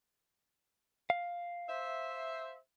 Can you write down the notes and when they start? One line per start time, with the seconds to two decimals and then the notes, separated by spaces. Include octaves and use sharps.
1.10 F5
1.69 C5 E5